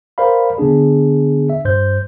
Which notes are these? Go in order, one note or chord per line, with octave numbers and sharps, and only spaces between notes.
A#4 C5 D5 F5 B5
D3 B3 D4 G#4
E5
G2 C5 G6